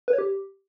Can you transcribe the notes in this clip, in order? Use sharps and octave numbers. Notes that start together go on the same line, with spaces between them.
B4
C#5
G4